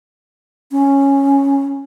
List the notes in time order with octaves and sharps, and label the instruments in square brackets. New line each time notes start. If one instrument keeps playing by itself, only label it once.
[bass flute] C#4